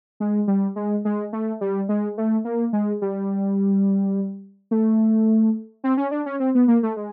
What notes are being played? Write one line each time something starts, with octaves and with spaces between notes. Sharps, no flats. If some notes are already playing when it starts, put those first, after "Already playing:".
G#3
G3
G#3
G#3
A3
G3
G#3
A3
A#3
G#3
G3
A3
C4
C#4
D4
C#4
C4
B3
A#3
A3
G#3